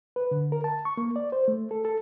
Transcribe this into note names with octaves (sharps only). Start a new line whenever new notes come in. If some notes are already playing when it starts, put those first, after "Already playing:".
B4
D3
A#4
A5
C#6
A#3
D5
C5
A3
A4
A4